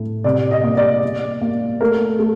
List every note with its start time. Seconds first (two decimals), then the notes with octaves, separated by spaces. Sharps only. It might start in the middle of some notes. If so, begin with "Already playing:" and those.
Already playing: A2 A3
0.24 C3 D5
0.51 D#5
0.63 A#3
0.77 D5
1.03 A#3
1.41 A#3
1.81 A3 A#4
2.19 A3